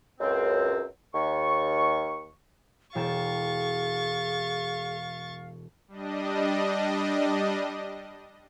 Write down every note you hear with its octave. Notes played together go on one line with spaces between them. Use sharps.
C#2 F#2 C4
D#2 C#6
E1 G#4 F5 G5 A5 C#6 A6
G3 D4 D#5